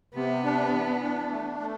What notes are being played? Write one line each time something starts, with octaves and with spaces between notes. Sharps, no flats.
C3 B3
D4
E3
D4
A3
A3